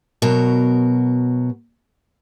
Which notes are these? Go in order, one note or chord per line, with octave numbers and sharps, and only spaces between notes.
B2 F#3 A#4